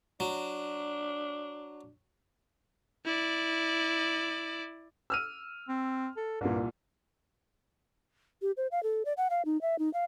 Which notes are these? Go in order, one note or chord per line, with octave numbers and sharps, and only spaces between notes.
F#3 D4
E4 D5
E6 F6 D#7
C4
A4
C2 G2 A#2
G4
C5
F5
A4
D5
F#5
F5
D#4
E5
D#4
F5